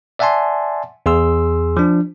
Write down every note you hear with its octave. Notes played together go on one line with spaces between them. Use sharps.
D5 E5 F#5 G#5 A5 C6
E2 G#4 C6 E6
F3 D4